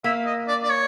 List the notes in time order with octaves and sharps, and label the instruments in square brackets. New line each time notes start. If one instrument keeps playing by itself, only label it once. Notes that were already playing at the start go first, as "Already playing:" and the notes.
[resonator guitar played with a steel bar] A#3 [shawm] E5
[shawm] D#5
D5
D5
C#5